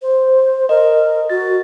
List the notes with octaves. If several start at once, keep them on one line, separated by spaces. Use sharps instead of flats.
C5
A#4 D#5
F#4 A6